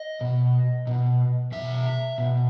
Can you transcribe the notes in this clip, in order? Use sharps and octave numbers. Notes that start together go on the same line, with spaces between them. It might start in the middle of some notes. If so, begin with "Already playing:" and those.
Already playing: D#5
B2
B2
B2 E5
B2